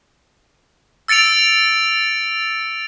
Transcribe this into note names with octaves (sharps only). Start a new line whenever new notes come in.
E6 A6 C#7 D7 F7